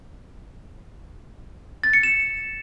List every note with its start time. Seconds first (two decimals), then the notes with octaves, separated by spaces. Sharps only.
1.83 A6
1.93 C#7
2.03 E7